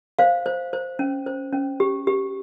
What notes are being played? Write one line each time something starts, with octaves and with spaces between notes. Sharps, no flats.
C5 F5
C5
C5
C#4
C5
C#4
G4
G4